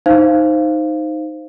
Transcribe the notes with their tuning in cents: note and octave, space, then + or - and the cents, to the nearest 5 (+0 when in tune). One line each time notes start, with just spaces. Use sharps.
D#4 +0 C5 +0 F5 -15